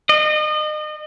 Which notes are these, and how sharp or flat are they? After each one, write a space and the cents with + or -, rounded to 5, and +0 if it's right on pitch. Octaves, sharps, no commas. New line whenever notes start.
D#5 -35